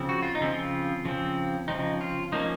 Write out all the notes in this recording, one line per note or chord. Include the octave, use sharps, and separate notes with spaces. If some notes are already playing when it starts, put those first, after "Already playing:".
Already playing: C#3 F3 C4
F#4
F4
D#4
C#3 F3 C4
F4
C#3 F3 C4
C#3 F3 C4 D#4
F4
F3 A#3 C#4 D#4